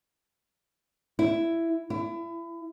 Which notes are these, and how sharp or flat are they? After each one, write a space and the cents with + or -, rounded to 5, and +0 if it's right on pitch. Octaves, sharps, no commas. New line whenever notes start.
E4 +10
E4 +30